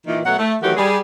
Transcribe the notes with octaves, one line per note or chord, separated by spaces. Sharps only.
A#2 D#3 E3
B2 F#3 A3 F#5
A3
D#3 E3 F#3 A3 F#4 G4
G3 G#4